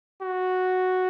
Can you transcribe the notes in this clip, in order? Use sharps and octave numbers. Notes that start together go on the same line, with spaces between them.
F#4